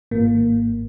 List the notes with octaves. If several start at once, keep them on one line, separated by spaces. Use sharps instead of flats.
G#1 A#3